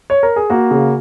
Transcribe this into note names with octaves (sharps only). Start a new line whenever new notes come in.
C#5
A#4
G#4
A#3 F#4
C#3